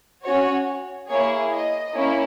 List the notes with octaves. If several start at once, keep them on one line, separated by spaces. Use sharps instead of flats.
C#4 F#4 C#5
A#3 E4 G#4 C#5
D#5
A#3 C#4 E4